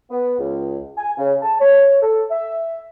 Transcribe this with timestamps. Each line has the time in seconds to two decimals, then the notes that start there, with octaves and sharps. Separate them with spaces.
0.11 B3
0.39 C#2
0.98 G#5
1.18 C#3
1.42 A5
1.60 C#5
2.02 A4
2.30 E5